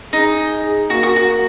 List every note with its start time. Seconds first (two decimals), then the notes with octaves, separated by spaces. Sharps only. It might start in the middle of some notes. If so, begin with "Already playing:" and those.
0.13 D#4 G#4
0.90 A#3 F#4
1.03 F#4
1.16 F#4